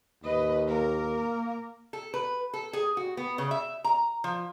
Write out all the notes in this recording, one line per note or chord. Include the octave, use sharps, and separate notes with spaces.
D#2 B4 D#5
A#3 A#4
A4
B4
A4
G#4
F#4
B3
C#3
E5
A#5
F3